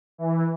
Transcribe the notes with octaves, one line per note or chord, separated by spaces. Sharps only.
E3